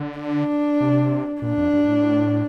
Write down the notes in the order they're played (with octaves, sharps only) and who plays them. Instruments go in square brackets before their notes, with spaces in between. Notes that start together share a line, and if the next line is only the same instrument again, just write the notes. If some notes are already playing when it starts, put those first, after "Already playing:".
Already playing: [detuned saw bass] D3
[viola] D4
[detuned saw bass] C3
[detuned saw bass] A#2 [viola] D4
[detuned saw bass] F2
G2
G2
A2